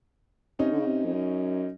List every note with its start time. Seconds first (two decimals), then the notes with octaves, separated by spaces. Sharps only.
0.59 C3 C#4 D#4
0.72 D3
0.80 C#3
0.86 C3
1.05 F2
1.14 F#2